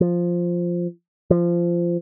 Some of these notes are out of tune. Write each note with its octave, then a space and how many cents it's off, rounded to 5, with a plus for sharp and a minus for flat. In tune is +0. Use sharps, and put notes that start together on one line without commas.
F3 +0
F3 -20